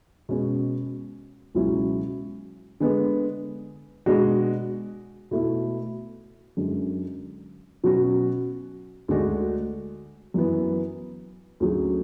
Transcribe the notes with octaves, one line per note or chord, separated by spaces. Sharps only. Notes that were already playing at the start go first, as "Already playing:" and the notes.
B2 G#3 C#4
C#2 B2 F#3 C#4 E4
D3 G#3 B3
B2 G#3 D4 F#4
B2 A3 E4
F#2 D3 G#3 C#4
B2 F#3 C#4 F#4
D2 D3 G#3 D4 F#4
F#2 E3 B3
D2 D3 F#3 C#4 G#4